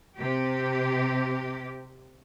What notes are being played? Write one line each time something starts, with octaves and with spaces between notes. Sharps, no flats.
C3 G4